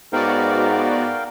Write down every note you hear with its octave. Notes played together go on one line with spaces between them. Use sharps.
G#2 B3 F#4 A#4 D5 F5 G5